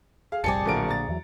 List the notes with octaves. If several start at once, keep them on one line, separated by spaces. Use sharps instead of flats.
G#4 F5
F1 A#1 G3 C4 G#4 D5 A5 C#7
D1 A#1 A#2 D3 A#4 D7
A#5 A6
E2 E3 F#3